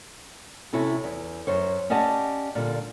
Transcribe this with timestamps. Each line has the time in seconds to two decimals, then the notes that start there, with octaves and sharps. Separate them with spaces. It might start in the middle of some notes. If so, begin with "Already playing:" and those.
0.73 C3 C#4 E4 F#4 A4
1.04 E2
1.47 F#2 C5 C#5
1.90 C#4 G4 D5 D#5 F#5 A5
2.55 A#2 D3 G3